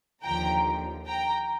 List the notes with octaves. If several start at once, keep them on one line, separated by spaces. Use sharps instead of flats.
D#2 D3 F3 G5 A#5
G5 A#5